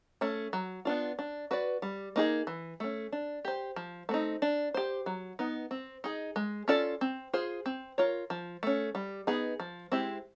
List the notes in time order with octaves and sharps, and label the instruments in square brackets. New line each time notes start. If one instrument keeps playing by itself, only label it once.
[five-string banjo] A3 C#4
F#3
B3 D4 F4
D4
F#4 B4 D5
G3
A#3 D#4 G#4
E3
A3 C#4
D4
G4 C5
F3
A3 C4 D#4
D4
G4 C5
F#3
B3 D#4
C4
D#4 G#4
G#3
C#4 F4 A4 D5
C4
F4 G#4 C5
C4
F4 A#4 C#5
F3
A3 C#4
G3
B3 D#4 G#4
F3
G#3 C4 E4 G4